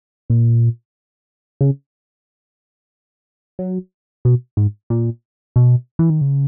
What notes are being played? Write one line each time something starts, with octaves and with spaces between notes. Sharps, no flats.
A#2
C#3
F#3
B2
G#2
A#2
B2
E3
D#3
C#3